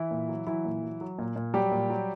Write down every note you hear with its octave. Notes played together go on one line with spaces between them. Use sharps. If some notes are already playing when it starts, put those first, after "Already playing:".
Already playing: E3 E4
A#2
F#3
E3 F#3 E4
A#2
F#3
F#3
A#2
A#2
F#3 G3 G4
A#2
F#3